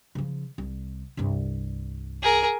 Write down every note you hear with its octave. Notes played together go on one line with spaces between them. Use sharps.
C#3 F3
C2
C2 G2
G#4 A#4